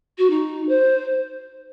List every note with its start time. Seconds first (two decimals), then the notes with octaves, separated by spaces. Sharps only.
0.18 F#4
0.30 D#4
0.69 C5